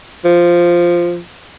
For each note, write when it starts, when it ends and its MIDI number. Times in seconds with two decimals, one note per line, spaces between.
0.25 1.20 53